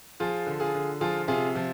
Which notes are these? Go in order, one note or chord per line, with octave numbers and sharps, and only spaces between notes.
F3 F4 G#4
D3
F4 G#4
D3
F3 F4 G#4
C3 F4 G#4
F3